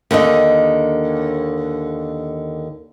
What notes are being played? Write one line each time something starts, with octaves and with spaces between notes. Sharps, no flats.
D#2 D3 D#3 D#5